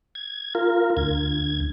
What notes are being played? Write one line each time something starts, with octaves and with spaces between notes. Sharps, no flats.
G#6
F4 A#4
D2 G#6